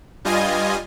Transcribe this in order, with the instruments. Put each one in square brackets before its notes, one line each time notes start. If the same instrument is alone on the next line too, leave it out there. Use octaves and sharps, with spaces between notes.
[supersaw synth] G2 G3 F4 D#5 G#5